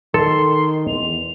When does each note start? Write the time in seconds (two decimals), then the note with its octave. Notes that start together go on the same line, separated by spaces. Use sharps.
0.14 D#3 A4 C6
0.88 E2 F7